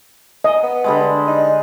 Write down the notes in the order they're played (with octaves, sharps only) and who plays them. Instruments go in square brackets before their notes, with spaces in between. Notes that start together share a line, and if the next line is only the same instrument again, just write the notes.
[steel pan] D#5
[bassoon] B3
[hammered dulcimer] D3 G3 G#3
[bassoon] D#4